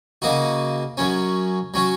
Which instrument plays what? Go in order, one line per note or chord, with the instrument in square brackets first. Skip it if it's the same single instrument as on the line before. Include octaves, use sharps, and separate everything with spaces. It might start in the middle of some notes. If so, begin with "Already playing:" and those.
[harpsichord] C#3 A#3 D#4 F#4
F#2 F#3 C#4
F#3 C#4 F#4